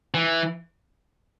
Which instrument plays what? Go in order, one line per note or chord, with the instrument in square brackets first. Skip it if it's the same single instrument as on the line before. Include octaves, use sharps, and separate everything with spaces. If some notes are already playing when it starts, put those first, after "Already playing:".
[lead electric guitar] E3